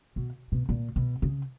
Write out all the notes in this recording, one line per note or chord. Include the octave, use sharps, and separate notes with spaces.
B2
B2
A#2
B2
C#3